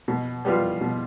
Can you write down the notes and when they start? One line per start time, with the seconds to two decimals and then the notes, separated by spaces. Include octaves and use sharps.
0.08 B2
0.45 G3 B3 F4
0.81 B2